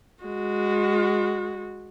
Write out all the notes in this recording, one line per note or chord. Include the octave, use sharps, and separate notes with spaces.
G#3 F#4